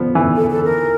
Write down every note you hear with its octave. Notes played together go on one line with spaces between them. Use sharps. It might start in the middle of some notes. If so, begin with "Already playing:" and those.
Already playing: F3 B3
E3
A4
A4
A#4